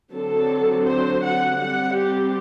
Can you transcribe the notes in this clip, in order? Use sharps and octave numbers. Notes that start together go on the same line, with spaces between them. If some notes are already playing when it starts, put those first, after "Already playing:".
D3 F#3 C4 A4
C5
F#5
G3 C4 F#5
G4